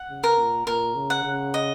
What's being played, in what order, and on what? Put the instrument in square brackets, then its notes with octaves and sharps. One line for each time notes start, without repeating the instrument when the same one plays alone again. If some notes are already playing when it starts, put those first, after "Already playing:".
Already playing: [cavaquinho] F#5
[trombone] C#3
[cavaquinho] A#4
[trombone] A#2
[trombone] A#2 [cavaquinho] A#4
[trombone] C#3
[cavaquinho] F#5
[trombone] C#3
[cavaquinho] D#5